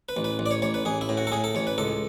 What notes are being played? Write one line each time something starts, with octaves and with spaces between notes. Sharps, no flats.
B4
A1
B4
A1
D5
C#5
A1 C#5
B4
A1 G#4
E4
A2
F#4
A4
A2 G#4
A4
A1 C#5
B4
C#2 A4